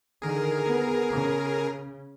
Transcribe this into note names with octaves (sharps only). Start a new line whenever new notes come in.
D3 D#3 G#4 A#4
B3
C#3